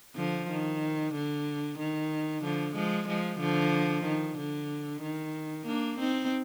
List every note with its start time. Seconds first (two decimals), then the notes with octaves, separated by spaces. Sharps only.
0.16 D3 F3
0.50 D#3
1.14 D3
1.79 D#3
2.43 D3 F3
2.76 F3 G#3
3.08 F3 G#3
3.40 D3 F3
4.05 D#3
4.38 D3
5.02 D#3
5.67 A#3 D4
5.99 C4 D#4